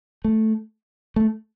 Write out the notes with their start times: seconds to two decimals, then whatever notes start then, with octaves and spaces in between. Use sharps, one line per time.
0.25 A3
1.16 A3